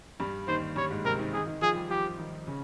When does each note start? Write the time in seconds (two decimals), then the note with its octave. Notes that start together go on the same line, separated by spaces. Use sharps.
0.20 G2 G3
0.48 D#2 D#3 C5
0.76 G2 G3 C#5
0.90 G#2 G#3
1.04 C3 C4 A#4
1.19 D#3 D#4
1.33 D#3 D#4 G#4
1.47 D#3 D#4
1.61 F3 F4 G#4
1.76 G3 G4
1.90 F3 F4 G4
2.18 D#3 D#4
2.47 C#3 C#4